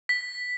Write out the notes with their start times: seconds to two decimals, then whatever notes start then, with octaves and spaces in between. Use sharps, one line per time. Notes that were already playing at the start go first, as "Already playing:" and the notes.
0.09 B6